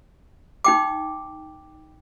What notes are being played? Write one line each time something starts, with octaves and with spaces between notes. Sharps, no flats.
D#4 G5 D6